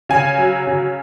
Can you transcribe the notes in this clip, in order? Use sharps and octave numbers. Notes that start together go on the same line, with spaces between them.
C#3 G#5
F#3
C#3